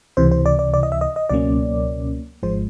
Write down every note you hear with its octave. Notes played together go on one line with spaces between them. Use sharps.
C#2 C3 E3 C5
C5
D5
D5
D5
D#5
E5
D#5
D#5
C#2 B2 F#3 A#3 C#4 D5
G#1 G#2 F3 G#3 C5